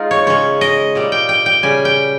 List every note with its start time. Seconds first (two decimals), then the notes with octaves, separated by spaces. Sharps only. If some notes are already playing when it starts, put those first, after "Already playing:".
Already playing: G#3 D#4 F4
0.11 C#5
0.27 C#3 G#3 C#5
0.61 D#5
0.95 A#2 G3
1.12 G5
1.29 G5
1.46 G5
1.63 C#3 G3 G#5
1.85 G5